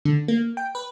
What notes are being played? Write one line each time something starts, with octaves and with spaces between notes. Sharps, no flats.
D3
A#3
G5
B4